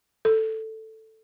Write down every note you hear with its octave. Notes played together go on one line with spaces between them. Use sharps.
A4